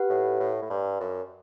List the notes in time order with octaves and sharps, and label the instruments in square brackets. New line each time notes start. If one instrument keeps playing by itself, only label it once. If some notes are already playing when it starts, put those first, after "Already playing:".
Already playing: [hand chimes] G4 B4 F#5
[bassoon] A2
A2
A2
G2
F#2